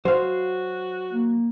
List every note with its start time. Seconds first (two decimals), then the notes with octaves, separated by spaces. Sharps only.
0.05 F#3 F#4 C5 F5
1.12 A#3